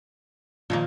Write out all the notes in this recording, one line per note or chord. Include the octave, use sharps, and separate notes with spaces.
A#2 D#3 F3 A#3